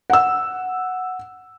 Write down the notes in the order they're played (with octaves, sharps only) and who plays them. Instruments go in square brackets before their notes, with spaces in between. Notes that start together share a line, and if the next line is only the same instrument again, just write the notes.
[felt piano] F#5 E6